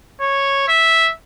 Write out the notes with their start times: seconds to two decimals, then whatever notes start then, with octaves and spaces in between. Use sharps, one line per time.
0.21 C#5
0.68 E5